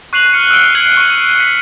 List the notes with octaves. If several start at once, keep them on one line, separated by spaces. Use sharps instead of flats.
C#6 F#6 C7 D#7 F7 F#7
F6 C#7
E6 C#7 D7 G7
G#6 C7 F#7
C#6 C#7
B6